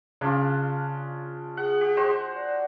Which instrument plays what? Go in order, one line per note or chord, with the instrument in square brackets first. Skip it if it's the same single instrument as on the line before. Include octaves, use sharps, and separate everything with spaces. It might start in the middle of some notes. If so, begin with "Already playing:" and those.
[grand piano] C#3 [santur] D4 F4
[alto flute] G#4 [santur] F#5
[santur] G4
G#3 F#4 C5
[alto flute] D5